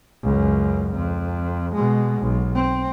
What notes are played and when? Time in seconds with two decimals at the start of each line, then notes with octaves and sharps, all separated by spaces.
0.23 C#2 F#2
0.93 F2
1.74 B2 G#3
2.21 B1
2.55 C4